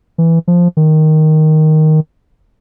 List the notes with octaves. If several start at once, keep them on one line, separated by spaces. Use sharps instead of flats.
E3
F3
D#3